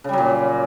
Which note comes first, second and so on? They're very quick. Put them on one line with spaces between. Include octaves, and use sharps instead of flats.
C#3 G3 F#3 A#2